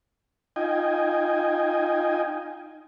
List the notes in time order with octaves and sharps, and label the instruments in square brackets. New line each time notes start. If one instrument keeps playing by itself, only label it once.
[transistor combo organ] D#4 F4 D#5 G5 G#5